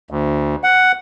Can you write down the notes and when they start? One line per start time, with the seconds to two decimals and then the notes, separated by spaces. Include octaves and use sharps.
0.11 D2
0.63 F#5